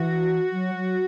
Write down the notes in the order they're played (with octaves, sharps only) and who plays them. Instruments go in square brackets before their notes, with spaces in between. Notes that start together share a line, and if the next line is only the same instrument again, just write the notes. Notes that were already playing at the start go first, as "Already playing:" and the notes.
Already playing: [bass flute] E3 [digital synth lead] F#4
[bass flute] F#3
F#3